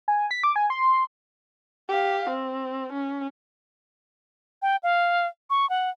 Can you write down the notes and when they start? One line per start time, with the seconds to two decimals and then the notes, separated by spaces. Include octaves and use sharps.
0.08 G#5
0.31 B6
0.43 D6
0.56 G#5
0.70 C6
1.89 G4 F5
2.30 C4
2.93 C#4
4.62 G5
4.83 F5
5.50 C#6
5.70 F#5